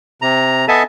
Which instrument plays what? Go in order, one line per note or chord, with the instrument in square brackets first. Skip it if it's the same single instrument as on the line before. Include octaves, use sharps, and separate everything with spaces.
[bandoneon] C3 A#5
B3 A4 D#5 E5 G#5 A5